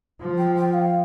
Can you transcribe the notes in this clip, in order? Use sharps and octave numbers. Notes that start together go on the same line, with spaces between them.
F3
G5
G5
F5